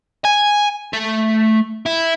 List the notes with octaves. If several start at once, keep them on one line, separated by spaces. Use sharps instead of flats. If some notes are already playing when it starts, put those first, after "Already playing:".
G#5
A3
E4